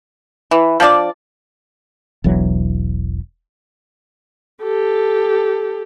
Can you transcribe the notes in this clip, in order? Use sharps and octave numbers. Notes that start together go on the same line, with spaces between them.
E3
F3 D4 G4 D5
E1 B1 E3 F#3
G4 A4